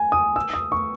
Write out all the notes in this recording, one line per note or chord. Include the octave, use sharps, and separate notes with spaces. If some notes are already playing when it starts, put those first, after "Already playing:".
Already playing: G#5
D#6
E6
D#6
C#6